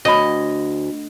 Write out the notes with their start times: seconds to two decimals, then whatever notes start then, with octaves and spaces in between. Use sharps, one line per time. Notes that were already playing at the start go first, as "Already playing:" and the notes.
0.05 D2 C#5 D#5 B5